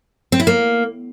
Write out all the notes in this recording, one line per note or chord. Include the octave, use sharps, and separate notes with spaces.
C4
E4
A#3